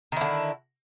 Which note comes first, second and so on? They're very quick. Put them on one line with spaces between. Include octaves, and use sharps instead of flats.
D#3 E4 D3